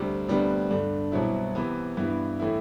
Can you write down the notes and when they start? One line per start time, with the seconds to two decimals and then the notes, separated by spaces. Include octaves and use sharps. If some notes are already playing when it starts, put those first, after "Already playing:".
Already playing: D2 C3 G3
0.28 D2 C3 G3 B3 D4
0.70 G2 D3 A3 D4
1.12 C2 B2 F#3 C4 E4
1.55 C3 E3 B3
1.97 G2 E3 B3 E4
2.40 A2 E3 A3 E4